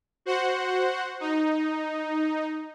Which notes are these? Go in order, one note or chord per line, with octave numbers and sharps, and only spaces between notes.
F#4 C5 F#5
D#4